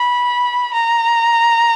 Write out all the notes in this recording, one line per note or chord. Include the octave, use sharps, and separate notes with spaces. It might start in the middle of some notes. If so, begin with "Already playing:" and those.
Already playing: B5
A#5